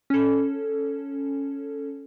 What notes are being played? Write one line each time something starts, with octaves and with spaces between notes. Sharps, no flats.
C#4 A4